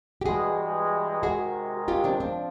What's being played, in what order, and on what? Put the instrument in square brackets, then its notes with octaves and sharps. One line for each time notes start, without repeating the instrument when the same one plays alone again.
[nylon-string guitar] G4
[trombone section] G2 E3 G#3 [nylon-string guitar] F#4 G#4
[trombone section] C3 D#3 G#3 [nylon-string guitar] F#4 G#4
[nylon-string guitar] F4 G4
C4 D4
[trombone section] F3 [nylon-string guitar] C4 D4